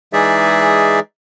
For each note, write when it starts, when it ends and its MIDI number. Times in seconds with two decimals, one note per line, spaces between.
0.13 0.99 52
0.13 0.99 56
0.13 0.99 63
0.13 0.99 68
0.13 0.99 74
0.13 0.99 76